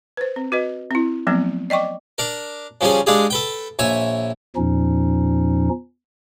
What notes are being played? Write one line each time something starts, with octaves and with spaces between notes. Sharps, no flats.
B4 C5
C4
F#4 B4 D#5
C4 E4
F3 F#3 A3 B3 C4
D5 D#5 G5 C#6 D6
D4 A#4
C#3 F3 G3 C#4 G#4
G#3 D4 F4 G4 G#4
A4 B4 G5
A#1 C#5 E5 G#5
E2 A#2 F3 C#4 D#4